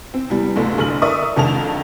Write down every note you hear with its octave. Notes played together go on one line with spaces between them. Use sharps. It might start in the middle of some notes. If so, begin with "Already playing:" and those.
C4
E2 G3
G1 D2 D3
F#1 D3 F6 F#7
A#4 D5 E5 C#6 D#6
F2 D3 D#3 G#3 A5 F7